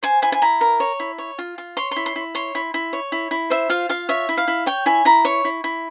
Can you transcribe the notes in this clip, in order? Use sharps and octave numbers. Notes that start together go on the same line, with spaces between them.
C5 G#5
E4 G#5
G#5
E4 A#5
A#4
C#5
E4
C#5
F4
F4
C#5 C6
E4 C6
C6
E4
C#5 C6
E4
E4
C#5
E4
E4
C5 E5
F4 F5
F4 F5
C#5 E5
E4
F5
E4
C#5 G5
E4 G#5
E4 A#5
C#5 C#6
E4
E4